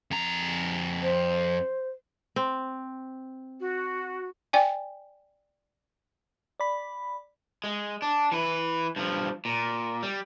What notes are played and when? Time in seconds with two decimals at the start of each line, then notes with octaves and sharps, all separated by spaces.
0.11 F2 A#5
1.02 C5
2.36 C4
3.61 F#4
4.53 D5 G5 G#5
6.60 D5 B5
7.64 G#3
8.02 D4
8.32 E3 B4
8.96 G2 F3
9.45 A#2
10.03 G3